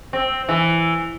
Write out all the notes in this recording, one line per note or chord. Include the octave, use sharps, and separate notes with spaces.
C4
E3